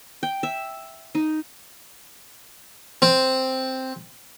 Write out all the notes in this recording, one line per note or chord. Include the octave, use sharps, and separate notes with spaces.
G5
E5
D#4
C4